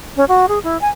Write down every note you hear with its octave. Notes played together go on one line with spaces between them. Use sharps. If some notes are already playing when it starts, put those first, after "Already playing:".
C#4
F#4
G#4
E4
G#5